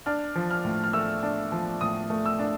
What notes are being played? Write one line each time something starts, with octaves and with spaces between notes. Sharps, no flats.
D4 F6
F3
F6
A2
F6
A3 E6
D4
F3
A2 D#6
A3
E6
D4